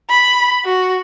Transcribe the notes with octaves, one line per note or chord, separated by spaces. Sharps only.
B5
F#4